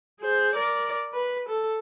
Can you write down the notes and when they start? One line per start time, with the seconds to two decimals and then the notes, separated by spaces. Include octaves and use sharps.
0.20 G#4 C5
0.56 A#4 D5
1.13 B4
1.49 A4